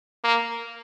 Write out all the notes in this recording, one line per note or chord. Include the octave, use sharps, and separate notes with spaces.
A#3